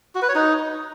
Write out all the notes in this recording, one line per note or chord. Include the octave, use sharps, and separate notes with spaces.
F#4
B4
C#5
D#4